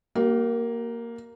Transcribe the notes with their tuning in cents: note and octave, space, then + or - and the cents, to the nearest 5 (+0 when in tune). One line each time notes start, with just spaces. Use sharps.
A#3 +0 G4 -45